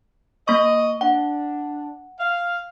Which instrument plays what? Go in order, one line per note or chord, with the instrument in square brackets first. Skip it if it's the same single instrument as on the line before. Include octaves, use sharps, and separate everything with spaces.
[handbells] A#3 C#6 [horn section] D#5
[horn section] D4 [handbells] F#5
[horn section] F5